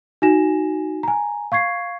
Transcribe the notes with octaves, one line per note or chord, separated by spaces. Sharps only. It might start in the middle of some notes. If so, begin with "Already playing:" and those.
D#4 F#4 G#5 A#6 E7
G#5 A#5
F5 C#6 G#6 C7